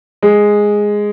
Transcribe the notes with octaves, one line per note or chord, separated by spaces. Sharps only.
G#3